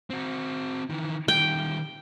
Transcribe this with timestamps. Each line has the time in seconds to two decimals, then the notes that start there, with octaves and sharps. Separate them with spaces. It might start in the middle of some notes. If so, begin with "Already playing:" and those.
0.10 C4 F#4
0.90 D#3 E3
1.28 D#3 G3 G5